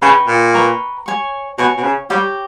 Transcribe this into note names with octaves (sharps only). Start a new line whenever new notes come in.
C#3 B4 G5 A#5 C#6
A#2
B4 G5 A#5 C#6
C#5 G#5 C#6
B2 C#5 G#5 C#6
B2
C#3
G3 G4 C#5 G5 A#5